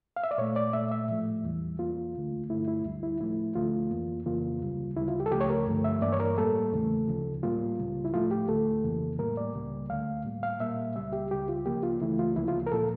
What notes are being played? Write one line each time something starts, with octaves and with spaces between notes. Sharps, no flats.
F5
E5
D5
A#2 A3 C#5
D5
A#2 A3 E5
E5
A2 F3 A3
E2 E3 G3
E2 E3 A#3 F4
D2 D3 A3
G2 D3 A3 E4
E4
D2 D3 G3
E4
A2 F3 A3 E4
D2 D3 F3 A3 F4
F2 E3 A#3
F2 C#3 E3 A#3 F4
D2 C#3 G3
D2 C#3 G3 E4
F4
G4
A4
C#2 C#3 F3 A3 G4
C#5
A#4
G2 D3 F3 A3
E5
G2 E3 A#3 D5
C#5
A#4
A2 G3 A#3 A4
E2 C#3 E3 A3
D2 C#3 F3
A2 G3 A#3 F4
C#2 C#3 G3
E4
A2 F3 A3 F4
G4
D2 D3 A3 A4
F2 C#3 E3 A#3
A2 G3 A#3 A#4
D5
C#2 C#3 G3 A#3
D2 D3 A3 F5
A2 G3 A#3
F5
A#2 G3 A#3 E5
C#2 C#3 G3 E5
G4
C#2 C#3 G3 G4
F4
D2 C#3 F3 A#3 G4
F4
C#2 C#3 E3 A3 E4
F4
D2 C#3 F3 A#3 E4
F4
A#4
A#2 F3 A#3 A4